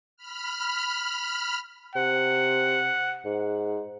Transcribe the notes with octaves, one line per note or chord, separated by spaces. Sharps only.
B5 F6
C3 F#5
G#2